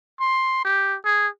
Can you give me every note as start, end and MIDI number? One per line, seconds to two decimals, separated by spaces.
0.20 0.60 84
0.65 0.96 67
1.05 1.27 68